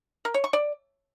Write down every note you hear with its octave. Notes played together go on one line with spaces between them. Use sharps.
A#4
C#5
C#6
D5